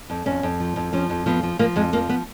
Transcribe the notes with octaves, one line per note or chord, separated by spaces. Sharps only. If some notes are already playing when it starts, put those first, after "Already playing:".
F2
F2 C#4
F2
F3
F2
F3 C#4
F2
F3 B3
F3
F3 A#3
F2 G#3
F3 A#3
B3